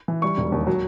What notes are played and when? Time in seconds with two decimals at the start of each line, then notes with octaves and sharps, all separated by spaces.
0.08 E3
0.22 G3 C#6
0.37 E1
0.52 D#2
0.67 F#3